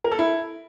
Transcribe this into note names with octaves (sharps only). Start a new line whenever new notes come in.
A#4
A4
E4